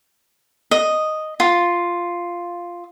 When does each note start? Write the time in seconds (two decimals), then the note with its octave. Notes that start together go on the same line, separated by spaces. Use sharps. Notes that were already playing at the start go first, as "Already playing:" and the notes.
0.71 D#5
1.40 F4